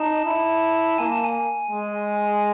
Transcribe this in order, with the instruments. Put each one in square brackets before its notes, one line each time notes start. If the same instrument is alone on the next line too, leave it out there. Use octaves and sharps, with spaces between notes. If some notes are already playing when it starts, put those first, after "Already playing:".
Already playing: [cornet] D#4 [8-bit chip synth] A5
[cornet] E4
[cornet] A#3 [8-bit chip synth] G#5
[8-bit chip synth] A5
G#5
[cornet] G#3